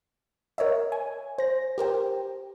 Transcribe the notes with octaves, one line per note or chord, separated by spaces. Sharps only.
A#4 C#5 D#5 E5
G#5
C5 A#6
G4 A#4 C5 G5